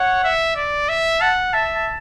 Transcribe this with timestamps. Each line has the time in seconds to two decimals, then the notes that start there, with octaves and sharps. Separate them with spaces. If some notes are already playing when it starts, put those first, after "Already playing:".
Already playing: C#5 F#5
0.24 E5
0.56 D5
0.89 E5
1.20 F#5 A5
1.53 E5 A5
1.75 A5